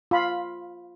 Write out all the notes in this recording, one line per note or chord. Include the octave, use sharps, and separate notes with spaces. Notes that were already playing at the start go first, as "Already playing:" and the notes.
F4 B5